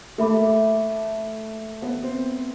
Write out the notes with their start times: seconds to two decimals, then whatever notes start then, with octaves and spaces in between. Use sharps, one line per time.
0.18 A3 A4 E5 B5 D6
1.82 B3
2.03 C4